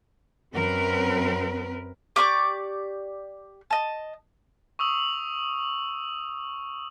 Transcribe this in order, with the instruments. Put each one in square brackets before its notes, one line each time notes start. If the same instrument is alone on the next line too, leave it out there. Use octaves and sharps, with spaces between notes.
[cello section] F#2 C4 A#4 B4
[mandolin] G4 D5 C#6 D6
D#5 A5
[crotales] C#6 D#6 E6 F#7